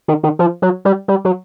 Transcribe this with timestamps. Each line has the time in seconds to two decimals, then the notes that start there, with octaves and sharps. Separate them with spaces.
0.08 D#3
0.23 D#3
0.39 F3
0.62 F#3
0.85 G3
1.08 G3
1.25 F#3